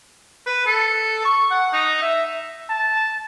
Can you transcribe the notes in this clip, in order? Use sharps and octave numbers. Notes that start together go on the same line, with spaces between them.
B4
A4
C#6
F#5
D#4
E5
A5